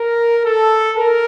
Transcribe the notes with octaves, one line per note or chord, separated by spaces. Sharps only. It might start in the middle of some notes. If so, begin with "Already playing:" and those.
Already playing: A#4
A4
A#4